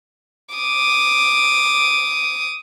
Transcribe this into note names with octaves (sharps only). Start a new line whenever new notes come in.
D6 D#6